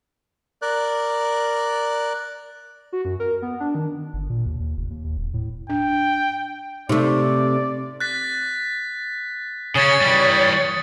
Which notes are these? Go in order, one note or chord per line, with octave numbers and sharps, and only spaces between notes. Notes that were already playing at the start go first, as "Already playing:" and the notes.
A#4 D5 F#6
F#4
F#2
A#4
B3
D4
D#3
G1
A#2
D#2
D#2
F1
D#2
D#2
D1
A2
D4 G5
C3 A3 D#4 D5
F#6 A6 B6
C#3 C#4 C#5 D#6 A6 C#7
E3 G3